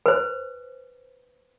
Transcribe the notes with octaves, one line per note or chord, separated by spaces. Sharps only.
B4 C5